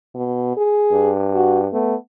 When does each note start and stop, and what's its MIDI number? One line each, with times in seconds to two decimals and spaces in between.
0.15 0.56 47
0.57 1.11 68
0.92 1.68 43
1.34 1.59 66
1.73 1.95 57
1.73 1.95 59